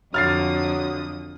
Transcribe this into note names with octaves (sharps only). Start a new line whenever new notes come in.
F2 D3 F#3 D#6 F6 A6 C7